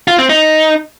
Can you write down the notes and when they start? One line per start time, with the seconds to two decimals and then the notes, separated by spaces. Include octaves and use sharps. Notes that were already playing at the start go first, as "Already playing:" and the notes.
0.08 F4
0.19 C4
0.29 D#4